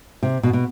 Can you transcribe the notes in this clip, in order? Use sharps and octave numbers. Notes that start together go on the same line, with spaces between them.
C3
B2
B2